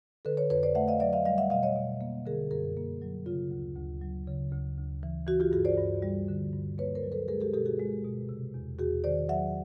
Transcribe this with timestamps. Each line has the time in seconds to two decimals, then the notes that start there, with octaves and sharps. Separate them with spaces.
0.25 D3 A4 B4
0.37 B4 C#5
0.50 F2 B4 C#5
0.63 C5 D5
0.75 A3 E5 F#5
0.88 D#5 F5
1.00 F#3 D5 E5
1.13 D#5 F5
1.25 G3 D#5 F5
1.38 E5 F#5
1.50 B2 D#5 F5
1.63 C#5 D#5
1.76 B2
2.01 A#3
2.26 D3 G#4 A#4
2.51 F#2 G#4 A#4
2.77 A#3
3.02 F#3
3.26 C#3 F4
3.51 D2
3.76 D2
4.01 F#3
4.28 C#3
4.53 D2
4.78 D2
5.03 E3
5.27 E3 F#4
5.40 F4 G4
5.52 G2 F#4 G#4
5.65 C5 D5
5.78 G2
6.02 G3
6.28 D3
6.53 G2
6.78 A#3 B4 C#5
6.95 A#4 C5
7.03 F#3
7.12 A4 B4
7.28 G#3 G#4 A#4
7.41 G4 A4
7.53 B2 G4 A4
7.66 F#4 G#4
7.79 G#3
8.04 B2
8.29 C3
8.54 E2
8.79 E2 F#4 G#4
9.04 D#3 C5 D5
9.29 F#3 E5 F#5